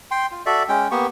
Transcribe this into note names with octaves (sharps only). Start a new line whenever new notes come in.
G5 C6
F4
F#4 A4 D5 E5
G#3 C#4 G5
A#3 B3 G4 C#6